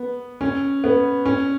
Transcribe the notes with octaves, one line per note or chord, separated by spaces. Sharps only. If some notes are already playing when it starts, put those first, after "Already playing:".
Already playing: B3
C#4
B3
C#4